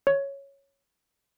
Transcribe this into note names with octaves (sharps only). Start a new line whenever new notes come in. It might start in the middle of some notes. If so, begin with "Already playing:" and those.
C#5